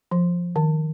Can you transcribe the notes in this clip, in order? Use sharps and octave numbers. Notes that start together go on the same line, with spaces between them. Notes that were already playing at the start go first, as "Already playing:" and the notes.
F3
D#3